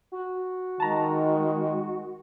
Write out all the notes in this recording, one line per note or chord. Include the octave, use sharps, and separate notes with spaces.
F#4
D#3 G#3 A5 A#5